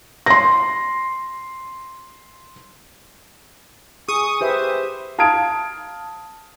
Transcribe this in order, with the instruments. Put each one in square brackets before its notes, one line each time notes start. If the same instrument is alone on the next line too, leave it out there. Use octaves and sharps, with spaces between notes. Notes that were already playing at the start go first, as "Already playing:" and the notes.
[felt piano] C6 A#6
[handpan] G#4 [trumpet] C#6 [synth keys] D#6
[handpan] G4 B4 E5 [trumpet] C5
[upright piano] F5 A5 D#6 F6 G#6 D7